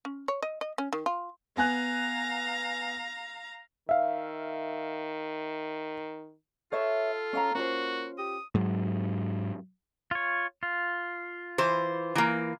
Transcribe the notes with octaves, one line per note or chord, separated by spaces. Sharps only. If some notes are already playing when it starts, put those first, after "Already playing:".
C#4
C#5
D#5
D#5
C#4
D#3
F4
B3 F5 G#5 A#5 F#6
D#3 E5 F5
F4 A4 B4 C#5 E5
C#4 F5 A#5
A#3 C#4 F4 F#4 C5
G4 D#6
G#2 F#3
F4 C#5
F4
E3 C5
E3 A#3